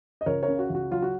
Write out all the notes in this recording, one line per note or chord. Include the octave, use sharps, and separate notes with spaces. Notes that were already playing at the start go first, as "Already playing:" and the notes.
D#5
C#2 A#4 C#5
A#4 C#5
C#3
F#4
C#2 F#4
F#3 F4
F#4